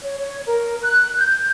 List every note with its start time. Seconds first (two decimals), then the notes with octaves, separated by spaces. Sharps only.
0.01 C#5
0.19 C#5
0.46 A#4
0.82 F#6
1.17 G6